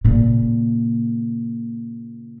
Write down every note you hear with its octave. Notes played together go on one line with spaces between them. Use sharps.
A#2 C#3